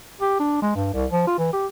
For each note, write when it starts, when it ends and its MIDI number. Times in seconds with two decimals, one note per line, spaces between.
0.21 0.38 67
0.40 0.60 62
0.62 0.72 56
0.75 0.93 43
0.94 1.06 36
1.11 1.25 53
1.27 1.36 65
1.38 1.53 52
1.53 1.66 67